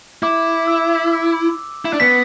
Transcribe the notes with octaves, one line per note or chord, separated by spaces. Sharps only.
E4 D6
E6
E4
D4
B3 B6